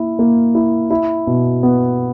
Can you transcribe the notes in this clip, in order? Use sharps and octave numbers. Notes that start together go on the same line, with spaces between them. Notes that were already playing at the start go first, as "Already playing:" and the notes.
Already playing: A#3 E4
A#3
E4
E4
B2
B3